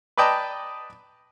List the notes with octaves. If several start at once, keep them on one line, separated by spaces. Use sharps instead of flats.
B4 D5 D#5 G5 A5 A#5